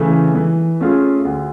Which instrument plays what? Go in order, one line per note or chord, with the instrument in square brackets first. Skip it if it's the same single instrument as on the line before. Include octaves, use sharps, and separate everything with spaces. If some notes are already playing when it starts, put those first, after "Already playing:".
Already playing: [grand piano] C#3 E3 A3
E3
A3 C#4 F4 G#4
D2